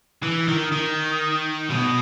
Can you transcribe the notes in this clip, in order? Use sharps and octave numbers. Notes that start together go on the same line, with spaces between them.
E3
D#3
D#3
B2